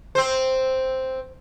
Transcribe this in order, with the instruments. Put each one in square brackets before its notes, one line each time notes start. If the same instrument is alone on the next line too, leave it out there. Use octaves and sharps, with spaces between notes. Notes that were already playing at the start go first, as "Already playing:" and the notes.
[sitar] C4 C5